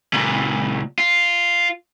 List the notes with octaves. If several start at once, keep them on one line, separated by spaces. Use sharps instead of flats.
C#2 A#2
F4